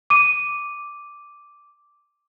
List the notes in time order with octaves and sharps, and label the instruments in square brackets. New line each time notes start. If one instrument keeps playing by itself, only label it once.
[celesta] D6 D#7